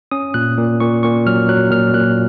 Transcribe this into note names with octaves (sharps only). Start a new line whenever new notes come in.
C#4 D#6
A#2 F#6
A#2
A#2 C#6
A#2 C#6
F#3 F6
F#3 F#6
A#2 F6
A#2 F#6